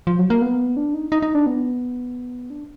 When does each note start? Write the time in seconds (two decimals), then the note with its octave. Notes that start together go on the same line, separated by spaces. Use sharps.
0.07 F3
0.19 F#3
0.30 A#3
0.42 B3
0.77 D4
0.94 D#4
1.12 D#4
1.22 D#4
1.35 D4
1.46 B3
2.50 D4